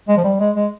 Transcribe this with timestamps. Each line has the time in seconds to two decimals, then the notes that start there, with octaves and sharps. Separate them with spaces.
0.08 G#3
0.17 F3
0.24 G3
0.40 G#3
0.56 G#3